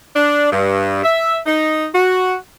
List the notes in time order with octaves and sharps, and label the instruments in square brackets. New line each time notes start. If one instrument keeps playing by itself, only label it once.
[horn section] D4
G2
E5
D#4
F#4